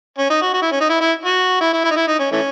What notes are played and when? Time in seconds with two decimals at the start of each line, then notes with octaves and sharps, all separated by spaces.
0.18 C#4
0.30 D#4
0.42 F#4
0.54 F#4
0.62 E4
0.72 C#4
0.81 D#4
0.90 E4
1.01 E4
1.26 F#4
1.61 E4
1.73 E4
1.85 E4
1.91 D#4
1.96 E4
2.08 D#4
2.19 C#4
2.32 E3 A3 C#4